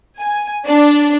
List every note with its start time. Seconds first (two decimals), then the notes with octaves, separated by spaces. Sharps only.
0.19 G#5
0.67 D4